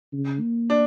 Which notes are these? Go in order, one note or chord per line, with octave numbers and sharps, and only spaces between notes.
C#3
A#3
D4